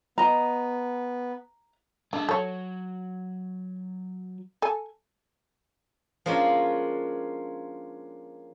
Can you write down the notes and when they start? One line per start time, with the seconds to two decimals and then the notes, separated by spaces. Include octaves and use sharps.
0.18 B3 D#5 A#5
2.13 G#3 D4 A4
2.29 F#3 A4 C#5
4.62 A4 G#5
6.26 F3 G#3 A#3 C#4 D4 F4